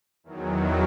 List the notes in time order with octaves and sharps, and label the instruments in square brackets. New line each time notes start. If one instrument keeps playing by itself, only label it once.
[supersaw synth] E2 D#3 F#3